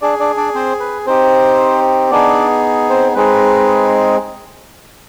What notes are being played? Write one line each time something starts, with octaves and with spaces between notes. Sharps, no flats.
D4 G#4 D5
D4 D5
D4 D5
C4 C5
B4
C4 D#4 G4 C5
B3 D4 D#4 G#4 D5
C4 C5
G#3 C4 D#4 G#4 B4